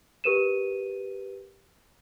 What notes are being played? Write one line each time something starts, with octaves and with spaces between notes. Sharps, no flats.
G4 A#4 B4 D#7 E7